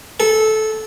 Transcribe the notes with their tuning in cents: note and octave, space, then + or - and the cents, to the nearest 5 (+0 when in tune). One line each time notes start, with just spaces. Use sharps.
A4 -15